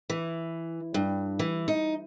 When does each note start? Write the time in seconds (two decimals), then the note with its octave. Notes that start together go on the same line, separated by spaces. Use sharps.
0.10 E3
0.94 G2
1.39 E3
1.68 D#4